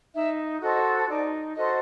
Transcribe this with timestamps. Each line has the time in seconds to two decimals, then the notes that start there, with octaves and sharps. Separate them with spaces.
0.14 D#4 E5
0.61 F#4 A4 C5 D#5
1.09 D#4 D5
1.56 F#4 A4 C5 D#5